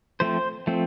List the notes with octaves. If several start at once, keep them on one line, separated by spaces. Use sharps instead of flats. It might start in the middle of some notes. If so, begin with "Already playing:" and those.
F3 A3 C4 C5
F3 A3 C4